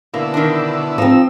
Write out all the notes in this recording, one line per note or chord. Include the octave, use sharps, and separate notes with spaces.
B2 D3 A#3 E4
D#3 D4
F3 C4 D#4 E6